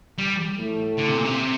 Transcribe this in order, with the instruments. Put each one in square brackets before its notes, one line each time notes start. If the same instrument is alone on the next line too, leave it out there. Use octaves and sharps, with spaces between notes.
[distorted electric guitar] G3
[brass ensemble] A2 A3
[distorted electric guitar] D3
C3
A#2
C3